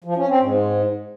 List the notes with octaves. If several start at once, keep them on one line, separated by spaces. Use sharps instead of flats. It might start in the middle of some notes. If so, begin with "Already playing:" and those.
F3
C#4
C4
G#2